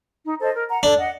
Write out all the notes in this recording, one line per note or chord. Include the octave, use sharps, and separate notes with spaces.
D#4
A4 C5 D#5
A#4
F#5 A#5
D4 A4
D#5 F#5